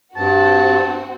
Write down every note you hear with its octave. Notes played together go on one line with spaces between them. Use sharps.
G2 C4 F#4 A5